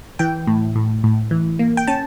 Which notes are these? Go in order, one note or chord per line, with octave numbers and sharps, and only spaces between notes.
E3 G5
A2
A2
A2
E3
A#3
G5
C#4 A5